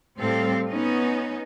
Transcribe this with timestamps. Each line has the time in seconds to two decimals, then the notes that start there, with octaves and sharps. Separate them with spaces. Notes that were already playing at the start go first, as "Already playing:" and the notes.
0.19 A2 G3 C4 A4 F5
0.70 B3 C#4 D#4